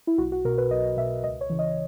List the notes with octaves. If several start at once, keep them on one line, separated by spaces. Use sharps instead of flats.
E4
B1 F#4
F#4
B2 A#4
B4
B1 D#5
B2 E5
C#2 D#5
C#5
C#3 E3
D#5